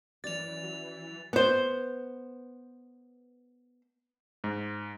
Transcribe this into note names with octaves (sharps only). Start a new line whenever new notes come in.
F#2 E3 C#4 D5 A6 F7
F#3
B3 C5
G#2